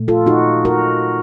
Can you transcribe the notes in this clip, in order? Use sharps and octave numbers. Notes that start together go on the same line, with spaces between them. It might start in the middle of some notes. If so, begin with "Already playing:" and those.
Already playing: A#2 A3
F4 A4
D#4 F#4
F#4 A#4